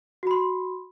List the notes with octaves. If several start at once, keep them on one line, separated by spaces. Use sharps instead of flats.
F#4 B5 C6